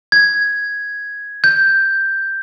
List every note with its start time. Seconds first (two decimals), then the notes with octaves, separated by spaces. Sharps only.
0.12 G#6
1.44 G6